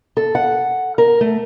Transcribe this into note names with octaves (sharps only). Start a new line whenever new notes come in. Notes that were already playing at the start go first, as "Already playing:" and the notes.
A4
F#5
A#4
A3